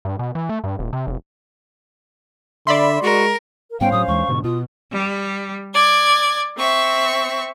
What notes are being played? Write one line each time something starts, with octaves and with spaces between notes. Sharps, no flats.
G2
B2
E3
A3
G2
D#1
C3
F1
D3 D5 E5 B5 C6
G#3 F#4 A#4
A#4
G#2 G3 B3 C#4 C5 F5 G5
A2 F#3 D#6
D#2 E3 G#3 C#6
G#2 B2 D3
B2 F4 D#6
G3
D5 G#6
C4 E5 C#6